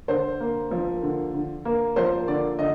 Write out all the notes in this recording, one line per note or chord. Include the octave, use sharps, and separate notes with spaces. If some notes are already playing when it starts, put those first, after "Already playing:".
D3 C5
A#3
F3
D3
D3
A#3
F3 C5
D3 D5
D3 D#5